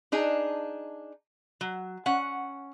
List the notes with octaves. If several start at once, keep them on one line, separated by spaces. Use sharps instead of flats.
D4 D#4 G#4
F#3
C#4 F#5